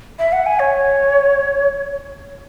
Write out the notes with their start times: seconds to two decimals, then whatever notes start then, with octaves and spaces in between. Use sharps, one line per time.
0.19 E5
0.32 F#5
0.46 G#5
0.59 C#5